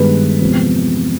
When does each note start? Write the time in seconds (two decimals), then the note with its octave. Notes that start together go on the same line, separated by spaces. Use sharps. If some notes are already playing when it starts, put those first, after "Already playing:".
Already playing: G2 D#3 G#3 B3 B4
0.41 E2 C3 F3 G#3